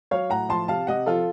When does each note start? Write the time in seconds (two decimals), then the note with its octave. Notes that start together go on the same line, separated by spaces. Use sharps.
0.11 F#3 C#5 F5
0.29 A2 F#5 A#5
0.49 F3 A5 C6
0.68 C3 F5 A5
0.87 C3 D#5 F#5
1.06 F3 F4 A4